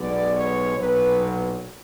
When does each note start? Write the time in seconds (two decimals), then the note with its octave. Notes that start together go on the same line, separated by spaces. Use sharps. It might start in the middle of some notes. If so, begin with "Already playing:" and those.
Already playing: B1 B2 G#3 B3 D5
0.34 C#5
0.77 B1 A#2 F#3 B3 B4